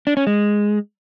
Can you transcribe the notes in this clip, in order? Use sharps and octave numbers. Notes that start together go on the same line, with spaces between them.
D4
C#4
G#3